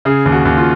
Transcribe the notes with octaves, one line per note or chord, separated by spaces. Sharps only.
C#3 G#4
D#2
F#4
D#2
F4